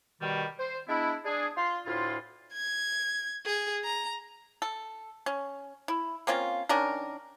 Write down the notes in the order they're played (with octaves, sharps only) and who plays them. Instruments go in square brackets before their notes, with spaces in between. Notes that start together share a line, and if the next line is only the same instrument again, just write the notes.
[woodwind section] B2 D#3 G3
C5
G#3 B3 D4 E4
D4 G#4
F4 C6
D2 A2 E4 F4
[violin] G#6
G#4
A#5
[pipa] A4
C#4
E4
A#3 C4 C#4 F4
D#3 C#4 D4 A#4